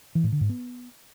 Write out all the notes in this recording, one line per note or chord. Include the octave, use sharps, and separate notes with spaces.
E3
A2
D3
G#2
B3